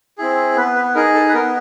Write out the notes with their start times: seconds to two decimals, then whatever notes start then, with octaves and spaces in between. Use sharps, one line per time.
0.18 C4 E4 G#4
0.56 B3 B4
0.75 B4
0.95 D#4 G#4 A#4
1.14 A4
1.29 B4
1.33 B3 A#4